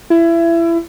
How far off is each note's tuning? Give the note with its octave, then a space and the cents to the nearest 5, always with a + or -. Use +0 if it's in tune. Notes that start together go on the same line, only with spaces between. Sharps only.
E4 +25